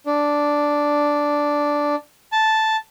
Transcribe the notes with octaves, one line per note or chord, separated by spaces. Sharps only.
D4
A5